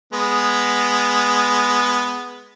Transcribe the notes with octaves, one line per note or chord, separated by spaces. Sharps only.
G#3 B3